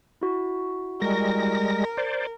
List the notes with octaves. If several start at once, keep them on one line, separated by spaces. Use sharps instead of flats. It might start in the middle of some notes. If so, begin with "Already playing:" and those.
E4 F#4
G3 G#3 A#4 A#6
C5 D5